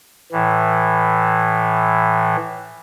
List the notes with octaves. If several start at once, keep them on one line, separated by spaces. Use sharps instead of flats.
A2 E3